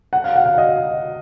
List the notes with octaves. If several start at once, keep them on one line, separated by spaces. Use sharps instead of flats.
F#5
F5
F#5
F5
D#5